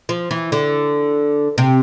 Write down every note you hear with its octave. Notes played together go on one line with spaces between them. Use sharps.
F3
E3
D3
C3